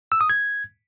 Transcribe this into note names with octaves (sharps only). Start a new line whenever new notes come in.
E6
D#6
G#6